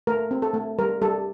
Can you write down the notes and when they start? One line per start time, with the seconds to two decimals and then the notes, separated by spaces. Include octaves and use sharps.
0.07 A3 A#4
0.31 C4
0.42 A4
0.54 A3
0.79 G3 A#4
1.02 G3 A4